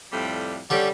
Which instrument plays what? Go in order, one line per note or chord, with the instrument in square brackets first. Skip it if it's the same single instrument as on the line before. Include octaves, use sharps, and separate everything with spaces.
[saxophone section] F2 A2 G3
[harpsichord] D3 C#4 [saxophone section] G3